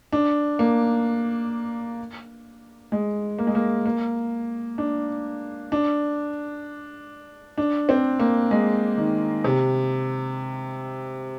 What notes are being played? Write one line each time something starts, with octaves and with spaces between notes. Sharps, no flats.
D4
A#3
G#3
A#3
G#3
A#3
A#3
D4
D4
D4
C4
A#3
G#3
D#3
C3